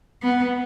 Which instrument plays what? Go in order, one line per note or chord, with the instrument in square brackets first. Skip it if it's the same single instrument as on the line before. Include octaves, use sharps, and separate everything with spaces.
[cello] B3